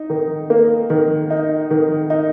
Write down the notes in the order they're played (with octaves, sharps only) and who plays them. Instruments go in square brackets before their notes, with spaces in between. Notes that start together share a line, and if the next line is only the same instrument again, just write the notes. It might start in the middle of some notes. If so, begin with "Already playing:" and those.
Already playing: [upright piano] D#4
D#3
A#3
D#3
D#4
D#3
D#4